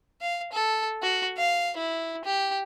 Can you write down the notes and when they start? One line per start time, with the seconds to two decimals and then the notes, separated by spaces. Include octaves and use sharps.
0.21 F5
0.52 A4
1.03 F#4
1.38 F5
1.77 E4
2.24 G4